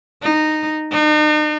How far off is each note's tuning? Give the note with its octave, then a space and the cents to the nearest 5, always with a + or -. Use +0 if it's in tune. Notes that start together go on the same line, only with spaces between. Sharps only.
D#4 -15
D#4 -45